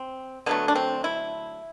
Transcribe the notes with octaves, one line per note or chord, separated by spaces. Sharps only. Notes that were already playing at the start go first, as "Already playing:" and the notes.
Already playing: C4
D3 F#3 A3 B3
D4
C4
E4